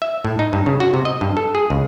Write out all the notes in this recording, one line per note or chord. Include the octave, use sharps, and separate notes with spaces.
E5
A2
D#4
G2
C#3
F#4
C3
D#5
G2
A4
G#4
C#2